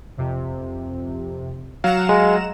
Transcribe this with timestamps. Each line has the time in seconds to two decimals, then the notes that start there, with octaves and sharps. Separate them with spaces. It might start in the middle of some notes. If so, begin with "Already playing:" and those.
0.17 F2 C3
1.84 F#3 F5 F#5 A#5 E7
2.09 G#3